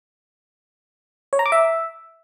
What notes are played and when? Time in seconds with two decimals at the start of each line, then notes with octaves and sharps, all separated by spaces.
1.33 C#5
1.39 A#5
1.46 D6
1.52 E5